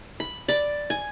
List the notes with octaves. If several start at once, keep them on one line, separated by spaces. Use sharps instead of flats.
B5
D5 B5
G#5